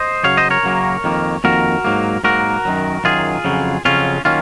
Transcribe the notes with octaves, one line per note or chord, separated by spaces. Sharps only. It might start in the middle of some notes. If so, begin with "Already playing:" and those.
Already playing: C5 D#5
F#2 C#3 F#3 C#5 F5
C5 D#5
A#4 C#5
F#2 C#3 F#3 A#3
F2 D#3 A#3
F2 D#3 A#3 F#4 A#4
G#2 F#3 A#3
G#2 F#3 A#3 F#4 A#4
F#2 D#3 F#3
F#2 D#3 F#3 F4 G#4
F2 C#3 F#3
F2 C#3 F#3 C#4 F4
D#3 F#3 A#3 C#4 F4